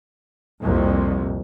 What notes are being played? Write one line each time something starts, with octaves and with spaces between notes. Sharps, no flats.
C2 F2 A#2